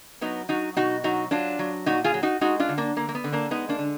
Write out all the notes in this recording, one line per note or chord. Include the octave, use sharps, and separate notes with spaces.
F#3 B3 D#4
F#3 D#4 F#4
B2 D#4 F#4
F#3 D#4 F#4
F#3 D4 F4
F#3
A#2 D#4 F#4
F4 G#4
F#3
D#4 F#4
G#3 D#4 F#4
D4 F4
D3
A#3 D4
D3 A#3
A#3
B3
D3
A#3 D4
G#3 B3 D#4
A#3 D4
D3